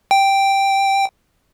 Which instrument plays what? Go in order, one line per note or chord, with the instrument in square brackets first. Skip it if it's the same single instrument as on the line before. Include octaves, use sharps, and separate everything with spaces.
[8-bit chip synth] G5